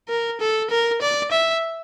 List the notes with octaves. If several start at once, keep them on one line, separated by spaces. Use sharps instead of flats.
A#4
A4
A#4
D5
E5